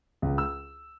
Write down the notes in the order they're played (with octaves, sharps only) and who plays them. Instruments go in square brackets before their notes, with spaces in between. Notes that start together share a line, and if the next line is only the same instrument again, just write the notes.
[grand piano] C#2
E6